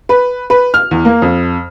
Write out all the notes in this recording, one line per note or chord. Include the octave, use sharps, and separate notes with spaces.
B4
B4
F6
E2
A#3
F2